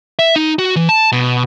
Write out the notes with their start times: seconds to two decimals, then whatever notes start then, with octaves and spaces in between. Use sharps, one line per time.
0.19 E5
0.36 D#4
0.59 F#4
0.76 E3
0.89 A5
1.12 B2